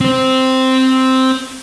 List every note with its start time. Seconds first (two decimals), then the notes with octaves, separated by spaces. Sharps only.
0.01 C4 C5